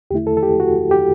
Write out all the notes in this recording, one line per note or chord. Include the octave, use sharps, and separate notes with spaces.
E2 D3 A3 E4 G4
A4
A4
G4
F#4
G4